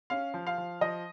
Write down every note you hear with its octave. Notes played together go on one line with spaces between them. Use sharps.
C#4 F5
F3
F5
F3
F3 D#5